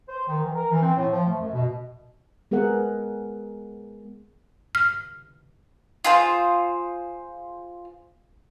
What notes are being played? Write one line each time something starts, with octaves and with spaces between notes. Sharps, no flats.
C5
D#3
E3
A#4
E3
C4
A2
F3
A3
F#2
B2
G#3 B3 G#4 A#4 F#5
F6
F4 G#4 C5